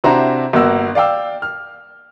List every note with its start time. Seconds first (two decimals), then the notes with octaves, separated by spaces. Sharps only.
0.04 C3 D4 E4 F#4 C5 A#5
0.53 G1 A#3 F#4 E6
0.95 D5 F5 G5 E6
1.42 F6